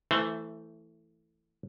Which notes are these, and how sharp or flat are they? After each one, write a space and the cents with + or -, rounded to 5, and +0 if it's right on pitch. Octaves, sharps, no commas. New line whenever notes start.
E3 +0 A3 +10 C5 -15